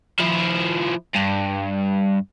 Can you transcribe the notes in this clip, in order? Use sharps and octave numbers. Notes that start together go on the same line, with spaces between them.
F3 E4
G2